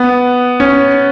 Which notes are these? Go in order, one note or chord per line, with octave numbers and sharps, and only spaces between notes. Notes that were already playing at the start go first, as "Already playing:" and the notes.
Already playing: B3
C#4